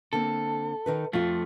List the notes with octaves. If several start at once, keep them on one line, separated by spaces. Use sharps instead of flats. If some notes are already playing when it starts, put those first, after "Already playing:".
D3 A#3 C4 A4
D#3 D#4 B4
F2 F3 A3 F4